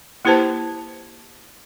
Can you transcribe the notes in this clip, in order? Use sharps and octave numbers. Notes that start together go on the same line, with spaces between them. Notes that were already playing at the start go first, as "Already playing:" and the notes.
A#3 E4 G4 B4 C5 A5